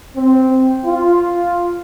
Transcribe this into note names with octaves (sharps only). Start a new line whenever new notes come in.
C4
F4